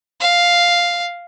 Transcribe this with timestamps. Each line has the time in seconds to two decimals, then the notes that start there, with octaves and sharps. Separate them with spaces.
0.21 F5